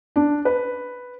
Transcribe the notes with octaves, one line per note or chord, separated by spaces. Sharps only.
D4
B4